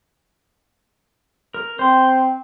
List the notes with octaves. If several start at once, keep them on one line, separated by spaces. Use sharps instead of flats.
A#4
C4 C5 C6